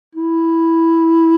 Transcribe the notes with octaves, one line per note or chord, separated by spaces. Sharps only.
E4